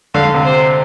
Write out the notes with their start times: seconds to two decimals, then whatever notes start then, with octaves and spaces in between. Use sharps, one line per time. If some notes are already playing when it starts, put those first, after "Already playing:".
0.14 D3 F5
0.25 D3
0.34 C3
0.45 C5